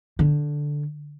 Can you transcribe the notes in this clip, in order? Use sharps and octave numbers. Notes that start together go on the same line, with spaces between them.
D3